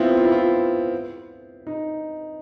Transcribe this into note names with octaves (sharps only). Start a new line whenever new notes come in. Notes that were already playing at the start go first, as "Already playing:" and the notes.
Already playing: B3 C4 E4 F4
F4
E4
F4
D#4